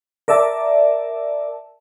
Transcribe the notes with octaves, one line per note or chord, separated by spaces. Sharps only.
A#4 D5 E5 A5